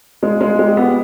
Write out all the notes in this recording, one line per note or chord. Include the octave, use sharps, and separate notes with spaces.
G#3 F4
G#3 F4
G#3 G4
G#4
B3 G4